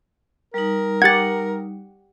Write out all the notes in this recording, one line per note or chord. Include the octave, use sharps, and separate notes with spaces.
G3 D#4 A#4
G4 F#5 G#6 A6